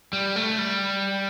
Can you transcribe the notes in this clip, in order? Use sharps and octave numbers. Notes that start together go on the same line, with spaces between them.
G3
A3
G3